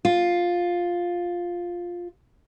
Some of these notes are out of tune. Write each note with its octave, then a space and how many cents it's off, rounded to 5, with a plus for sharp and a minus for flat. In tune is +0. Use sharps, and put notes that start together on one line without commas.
F4 +5